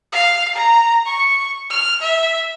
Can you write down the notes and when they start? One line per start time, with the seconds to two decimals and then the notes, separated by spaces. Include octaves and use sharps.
0.12 F5
0.55 A#5
1.06 C#6
1.70 F6
2.02 E5